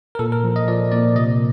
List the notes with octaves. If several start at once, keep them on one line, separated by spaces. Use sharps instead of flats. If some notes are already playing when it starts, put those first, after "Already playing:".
A#4
A#2 A4
A#4
F3
D#5
F3 D5
A#2 D5
C3 D#5